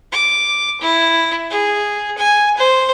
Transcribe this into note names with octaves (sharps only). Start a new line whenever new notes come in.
D6
E4
G#4
G#5
C5